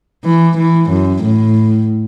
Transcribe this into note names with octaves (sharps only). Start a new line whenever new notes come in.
E3
E3
F#2
A2